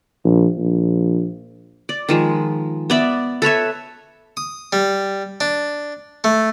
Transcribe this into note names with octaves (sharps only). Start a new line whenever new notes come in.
A#1
A#1
D5
D#3 F3 G#3
B3 D5 E5
A4 B4 C#5 E5
D#6
G3
D4
A3